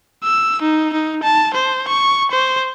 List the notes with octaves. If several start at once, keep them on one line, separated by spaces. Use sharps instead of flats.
E6
D#4
D#4
A5
C5
C#6
C5